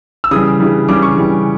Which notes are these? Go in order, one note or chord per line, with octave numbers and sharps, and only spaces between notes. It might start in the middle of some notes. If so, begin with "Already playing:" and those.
E6
C#3 E3 G3 D#6
C#3 E3 G3
C#3 E3 G3 D6
C#6
C#3 E3 G3